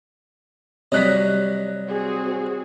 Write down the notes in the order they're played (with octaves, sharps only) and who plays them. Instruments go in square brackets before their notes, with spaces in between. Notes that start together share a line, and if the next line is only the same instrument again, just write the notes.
[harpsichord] C3 F#3 G3 [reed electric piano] C#5 [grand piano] D#5 F#6 B6
[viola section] C4 F#4 G#4